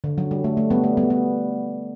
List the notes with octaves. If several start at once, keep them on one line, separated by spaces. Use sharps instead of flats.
D3
F#3
G3
A3
A3
G3 B3
A3
G3 B3
G3 B3